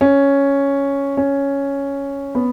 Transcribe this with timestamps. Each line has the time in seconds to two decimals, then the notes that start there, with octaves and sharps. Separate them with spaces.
0.01 C#4
1.17 C#4
2.35 B3